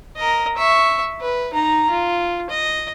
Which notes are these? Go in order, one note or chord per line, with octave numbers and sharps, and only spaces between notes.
A#4 D#5
E5 C#6
B4
D#4 A#5
F4
D#5